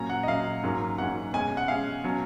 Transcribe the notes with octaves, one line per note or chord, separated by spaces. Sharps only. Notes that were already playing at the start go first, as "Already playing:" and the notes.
Already playing: A#2 F#3 C#4 A#5
F#5
D#5
A#2 F#3 C#4 F5
G#2 F#3 A#3 C#4
G#2 F#3 A#3 C#4 F#5
B2 G#3 C#4 G#5
F#5
B2 G#3 C#4 F5
B2 F#3 C#4